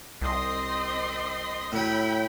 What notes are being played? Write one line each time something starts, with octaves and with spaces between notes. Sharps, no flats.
C2 C4 D#5 C6
A2 F#3 G5 B5